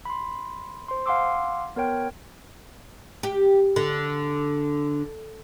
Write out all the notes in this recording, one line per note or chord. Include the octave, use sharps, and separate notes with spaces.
B5 C6
C5 C6
F5 F#5 G#5 C6 D6 E6
B3 A#4 C#5 G5
G4
D3